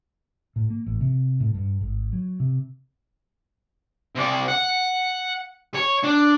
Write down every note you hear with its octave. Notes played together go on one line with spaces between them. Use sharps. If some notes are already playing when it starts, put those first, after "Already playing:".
A2
A#3
A1
C3
A2
G2
G#1
F#3
C3
C3 D5
F#5
C#5
D4